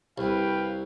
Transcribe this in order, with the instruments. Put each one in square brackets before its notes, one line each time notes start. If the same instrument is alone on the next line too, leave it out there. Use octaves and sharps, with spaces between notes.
[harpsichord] C2 [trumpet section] B4 F5 G5